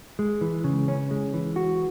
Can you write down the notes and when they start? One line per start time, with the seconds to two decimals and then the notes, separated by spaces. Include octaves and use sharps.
0.19 G#3
0.41 E3
0.64 C#3
0.88 C#4
1.11 G#3
1.34 E3
1.56 F#4